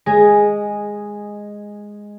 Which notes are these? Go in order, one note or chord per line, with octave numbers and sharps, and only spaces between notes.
G#3 G#4